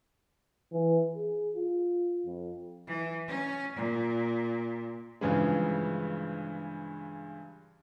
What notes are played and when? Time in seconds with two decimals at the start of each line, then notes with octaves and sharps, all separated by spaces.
0.72 E3
1.15 G#4
1.56 F4
2.26 F2
2.87 E3
3.28 C#4
3.76 A#2
5.21 G2 C#3 E3 F3 G#3